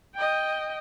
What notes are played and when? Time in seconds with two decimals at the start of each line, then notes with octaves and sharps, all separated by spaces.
0.15 D#5 G5